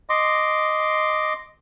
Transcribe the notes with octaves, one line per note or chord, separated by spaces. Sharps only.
D#5 C6 D6